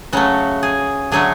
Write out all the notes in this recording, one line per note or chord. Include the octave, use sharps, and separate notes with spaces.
C#3 F#3 A3 F#4
G#4
D3 F#3 A3 G#4